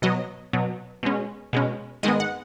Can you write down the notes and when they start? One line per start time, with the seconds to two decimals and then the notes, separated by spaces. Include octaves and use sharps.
0.02 B2 F#3 B3 D#5
0.53 B2 F#3 B3
1.03 B2 G#3 C#4
1.53 B2 G#3 C#4
2.03 G#2 D#3 G#3 B3 D#5
2.20 F#5